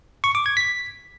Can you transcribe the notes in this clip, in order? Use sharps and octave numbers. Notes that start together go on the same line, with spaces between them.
C#6
D6
G#6
B6